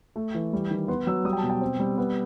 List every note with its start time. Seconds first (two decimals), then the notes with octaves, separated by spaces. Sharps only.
0.16 A3
0.34 E3
0.53 G3
0.71 D#3
0.88 B3 C6
1.07 F#3 E6
1.25 G3 D#6
1.33 G5
1.38 A5
1.43 B2
1.50 G5
1.61 C4
1.80 G3
1.98 B3